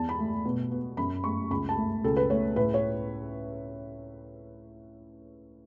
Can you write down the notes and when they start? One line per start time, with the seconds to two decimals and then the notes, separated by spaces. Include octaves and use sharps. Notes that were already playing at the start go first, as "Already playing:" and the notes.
Already playing: E2 A5
0.09 B5
0.19 A3
0.45 B2
0.71 B3
0.97 F#2 B5
1.24 A3 C#6
1.51 C#2 B5
1.69 A5
1.77 A3
2.04 C#2 A4
2.17 B4
2.30 A3 C#5
2.56 A2 B4
2.74 C#5